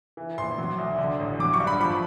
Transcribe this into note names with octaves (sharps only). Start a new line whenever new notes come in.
E3
A#1 C6
F#3
D2
D3
A1
F#3 D6
C#6
G2
B5
F3 B5